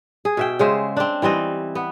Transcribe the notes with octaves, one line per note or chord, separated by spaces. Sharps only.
G#4
B2 E5 G5
C#3 G#3 C5 E5
C4 D4
E3 G3 C4 D#5
B3